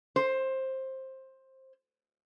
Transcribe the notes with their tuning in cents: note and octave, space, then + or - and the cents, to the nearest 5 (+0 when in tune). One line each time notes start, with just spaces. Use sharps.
C5 +15